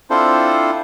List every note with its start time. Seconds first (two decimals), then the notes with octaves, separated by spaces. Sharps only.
0.10 C4 D4 E4 F4 A4 C5